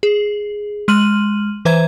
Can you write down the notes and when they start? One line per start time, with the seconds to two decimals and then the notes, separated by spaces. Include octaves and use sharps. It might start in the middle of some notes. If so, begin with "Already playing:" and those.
0.03 G#4
0.88 G#3 C6 F6 D#7 F#7
1.65 E3 B4 C5 E5 A#5 G#6